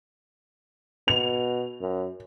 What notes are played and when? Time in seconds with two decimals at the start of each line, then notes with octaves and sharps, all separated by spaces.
1.08 B2 F7
1.81 F#2